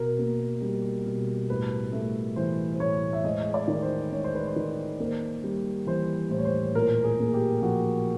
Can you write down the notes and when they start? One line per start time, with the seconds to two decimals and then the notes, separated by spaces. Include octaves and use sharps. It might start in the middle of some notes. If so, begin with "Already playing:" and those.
Already playing: B2 A#4
0.19 A#3
0.62 G3
1.06 B2
1.49 A2 B4
1.92 A3
2.36 E3 C5
2.73 C5
2.80 A2 C#5
3.13 E5
3.24 G#3 D#5
3.54 D5
3.68 D#3
3.82 C5
4.12 G#3 C#5
4.24 C5
4.35 B4
4.47 C5
4.56 D#3
5.00 A#3
5.44 G3
5.87 E3 C5
6.30 A2 C5
6.38 C#5
6.45 C5
6.74 A#2 A#4
7.04 G#4
7.19 A#3
7.33 G4
7.62 F3 F#4